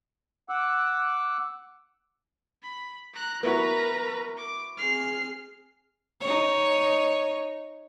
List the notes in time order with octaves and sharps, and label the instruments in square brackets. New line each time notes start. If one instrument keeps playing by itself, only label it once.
[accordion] F#5 D6 E6 F#6
[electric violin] B5
A#5 F#6
[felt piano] B3 E4 F#4 [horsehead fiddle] A#4 [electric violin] B4 A#5
[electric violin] D6
[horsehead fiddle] C4 G#4 [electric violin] F6 C7
[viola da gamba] D#4 C#5